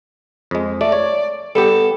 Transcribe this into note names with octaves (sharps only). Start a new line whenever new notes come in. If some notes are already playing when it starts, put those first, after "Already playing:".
F2 G#3
A3 D5
C#5
G3 B3 G4 A4